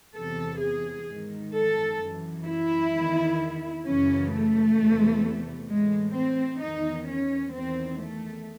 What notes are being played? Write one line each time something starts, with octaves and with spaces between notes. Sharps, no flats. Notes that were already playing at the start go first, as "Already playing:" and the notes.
E2 C3 E3 A4
G#4
G#2 D#3
A4
F#2 E3
E4
E2 D#3
F#2 C#3 E3 C#4
A3
E2 C3 E3
A2 E3 G#3
C4
E2 D#3 D#4
C#4
E2 D#3 C4
A3